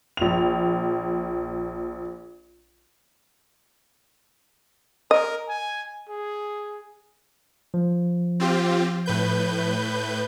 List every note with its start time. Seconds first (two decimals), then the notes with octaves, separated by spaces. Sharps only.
0.17 A#1 F7
5.11 A#4 D#5
5.48 G#5
6.08 G#4
7.74 F3
8.40 C4 F4 G4
9.06 A2 B4 G6